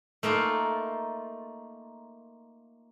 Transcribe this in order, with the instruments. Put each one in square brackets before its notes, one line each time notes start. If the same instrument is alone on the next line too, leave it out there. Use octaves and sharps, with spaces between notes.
[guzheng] A3 A#3 D#4 F4